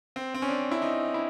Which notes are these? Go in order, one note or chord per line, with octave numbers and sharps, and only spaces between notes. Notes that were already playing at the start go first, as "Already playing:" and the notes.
C4
C4
C#4
D4
E4
D#4
E4